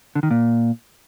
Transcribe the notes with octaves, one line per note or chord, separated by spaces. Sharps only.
D3
D#3
A#2